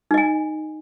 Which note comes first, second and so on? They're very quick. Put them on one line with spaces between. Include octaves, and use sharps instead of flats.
D#4 D#5 G#5